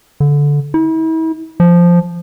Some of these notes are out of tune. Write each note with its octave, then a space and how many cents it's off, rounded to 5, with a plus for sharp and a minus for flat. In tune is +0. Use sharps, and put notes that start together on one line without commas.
D3 -15
E4 -40
F3 -5